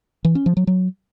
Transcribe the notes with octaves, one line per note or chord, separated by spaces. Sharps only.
E3
C#4
F3
F#3
F#3